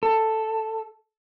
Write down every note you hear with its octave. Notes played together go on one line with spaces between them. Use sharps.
A4